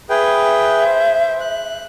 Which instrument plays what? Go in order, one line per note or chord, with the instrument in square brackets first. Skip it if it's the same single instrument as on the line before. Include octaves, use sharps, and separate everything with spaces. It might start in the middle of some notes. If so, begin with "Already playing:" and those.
[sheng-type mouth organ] G#4 B4 G5 [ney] E5
[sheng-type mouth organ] C5
F#6